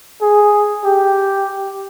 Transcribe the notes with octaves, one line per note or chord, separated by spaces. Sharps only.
G#4
G4